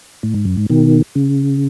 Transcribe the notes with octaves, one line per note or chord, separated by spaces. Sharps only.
A2
G#2
F#2
G#2
B2 D#3
C#3